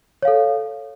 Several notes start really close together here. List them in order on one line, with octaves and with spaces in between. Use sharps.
C#5 F5 A4